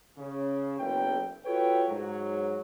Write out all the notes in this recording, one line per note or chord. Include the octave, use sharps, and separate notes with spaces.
C#3
F#1 B1 G5
F4 F#4 A4 B4 C#5 G5
G#2 F#3